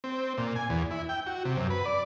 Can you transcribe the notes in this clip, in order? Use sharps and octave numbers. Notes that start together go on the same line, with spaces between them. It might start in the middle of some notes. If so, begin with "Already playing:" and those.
C4
A#2
G#5
E2
E4
G5
F#4
C3
F#2
B4
D5